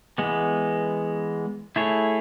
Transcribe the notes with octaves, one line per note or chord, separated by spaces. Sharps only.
E3 G#3 B3
A3 E4 G#4 C#5